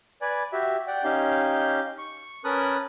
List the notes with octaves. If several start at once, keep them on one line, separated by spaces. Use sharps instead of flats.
B4 D5 G#5
F#4 G4 E5
D5 F#5 G5
C#4 D#4 G4 F5 G6
C#6
C#4 A#4 B4 A5 D#6 F#6